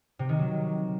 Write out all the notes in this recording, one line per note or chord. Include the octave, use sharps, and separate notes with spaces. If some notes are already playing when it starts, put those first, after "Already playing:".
C3
D#3
F#3